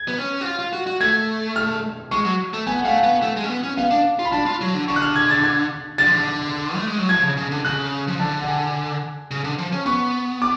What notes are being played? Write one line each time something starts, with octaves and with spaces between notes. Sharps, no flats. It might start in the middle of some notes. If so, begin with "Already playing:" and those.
Already playing: G#6
B3
C#4
F#4
F4
F4
F#4
F#4
A3 G#6
F6
G#3 C#6
F#3
A3
B3 G#5
F#5
A3 F5
F#5
B3
A3
G#3
C#4
B3
C#4
B3 F5
D4
F4
B5
D4 A5
F4
F#3
D3
D3 C#6
F#6
F6
G#6
A6
G#6
D3 A6
F3
D3
A3
G#3
F#3
F3 G#6
C#3
C#3
D3
C#3 F#6
F3
D3 A5
F#5
G#5
C#3
D3
F3
C#4
B3 C#6
D6